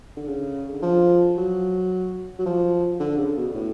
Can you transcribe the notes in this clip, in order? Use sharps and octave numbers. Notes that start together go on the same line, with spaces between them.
D3
C#3
D3
F3
F#3
F#3
F3
D3
C#3
B2
A2